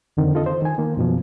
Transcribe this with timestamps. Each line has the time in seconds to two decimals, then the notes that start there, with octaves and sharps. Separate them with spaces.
0.17 F2 D3 D#3 C4
0.35 F4 A4 D#5
0.46 C5
0.62 D#3 G#5
0.78 D#3 A#3
0.97 F#2 B2 F3